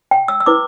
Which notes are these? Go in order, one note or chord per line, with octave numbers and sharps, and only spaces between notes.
G5
E6
E6
E4 B4 D6